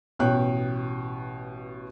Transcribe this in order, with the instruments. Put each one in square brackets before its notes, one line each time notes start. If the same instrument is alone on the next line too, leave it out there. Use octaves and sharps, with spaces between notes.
[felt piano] A1 B2 C#5 G5 F#6